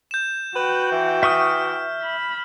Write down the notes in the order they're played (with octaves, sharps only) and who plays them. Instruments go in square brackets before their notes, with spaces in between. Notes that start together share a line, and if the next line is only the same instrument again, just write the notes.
[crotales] G6 E7
[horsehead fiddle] F#4 G5 [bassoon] B4
[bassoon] E3
[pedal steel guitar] E5 C#6 D#6 [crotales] F6
[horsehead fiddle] B5